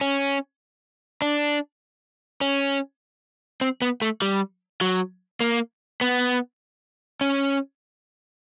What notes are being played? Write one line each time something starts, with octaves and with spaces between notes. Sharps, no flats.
C#4
D4
C#4
C4
B3
A3
G3
F#3
A#3
B3
C#4